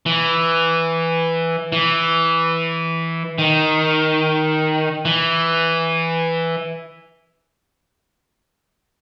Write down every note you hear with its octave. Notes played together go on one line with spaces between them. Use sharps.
E3
E3
D#3
E3